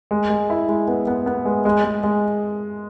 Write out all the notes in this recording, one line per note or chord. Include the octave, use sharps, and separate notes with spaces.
G#3
G#3
E4
G#3
B3
B3
B3
G#3
G#3
G#3
G#3